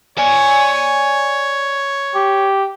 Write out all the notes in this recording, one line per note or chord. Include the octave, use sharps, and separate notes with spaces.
C#5 D5 G#5
G4